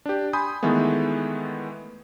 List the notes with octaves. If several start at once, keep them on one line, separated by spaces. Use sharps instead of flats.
D4 G4
G#5 B5 C6 D#6 G6
D#3 E3 G#3 A3 B3